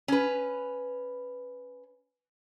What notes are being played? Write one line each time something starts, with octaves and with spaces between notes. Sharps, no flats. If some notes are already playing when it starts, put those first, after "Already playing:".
C#4 B4